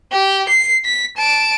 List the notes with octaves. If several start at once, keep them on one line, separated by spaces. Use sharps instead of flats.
G4
C7
B6
A5 D7